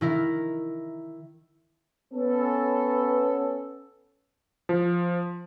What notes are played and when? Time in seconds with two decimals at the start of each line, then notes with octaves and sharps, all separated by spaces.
0.01 D#3 E4 A#4
2.13 B3 C#4 A4
4.69 F3